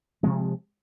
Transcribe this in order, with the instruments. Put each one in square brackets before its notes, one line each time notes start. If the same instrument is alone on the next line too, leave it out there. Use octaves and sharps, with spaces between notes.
[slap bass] C3 F3 G#3 C4